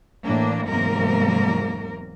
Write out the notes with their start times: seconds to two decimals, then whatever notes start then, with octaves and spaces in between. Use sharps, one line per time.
0.24 A2 E3 A#3 D4
0.67 E2 G#2 C3 F#3 A#3 A#4